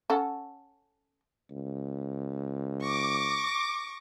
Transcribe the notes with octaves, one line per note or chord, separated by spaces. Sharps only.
C#4 A4 F#5
C#2
C#6 D6 A#6